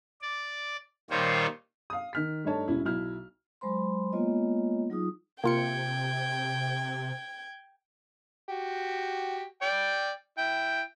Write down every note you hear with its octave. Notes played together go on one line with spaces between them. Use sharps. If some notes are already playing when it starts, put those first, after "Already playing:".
D5
A#2 D#3 G3 F4 C5 C#5
F5 D#6
D#3 F6 B6
G2 A3 D#4 C#5 A5
E1 C#4 E4
B1 E4 F6
F#3 G#3 C5 B5 C6
G#3 A#3 B3 F4 C#5 D#5
F#3 D#4 F4 G#4 D#6
C3 A#3 F4 G5 G#6 C#7
F#4 G4
D5 G5
E4 G5